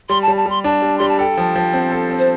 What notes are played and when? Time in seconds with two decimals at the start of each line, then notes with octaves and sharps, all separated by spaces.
0.09 G3 C6
0.22 A5
0.28 G3
0.37 A5
0.46 G3 C6
0.64 D4 A5
0.82 G3
0.98 G3 C6
1.09 A5
1.19 A4 G5
1.37 F3
1.55 F3
1.73 C4
1.92 A4
2.10 C4
2.19 C5